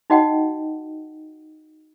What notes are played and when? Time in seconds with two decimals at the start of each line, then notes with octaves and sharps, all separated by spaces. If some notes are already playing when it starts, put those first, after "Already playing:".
0.10 D#4 F#4 D#5 F#5 G5